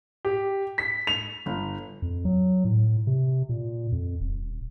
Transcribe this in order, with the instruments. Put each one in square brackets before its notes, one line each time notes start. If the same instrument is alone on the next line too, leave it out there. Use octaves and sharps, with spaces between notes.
[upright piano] G4
B6
F7
G1
[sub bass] F2
F#3
A2
C3
A#2
F2
D#1